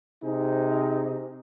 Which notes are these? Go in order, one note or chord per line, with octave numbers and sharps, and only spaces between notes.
C3 D#4 G#4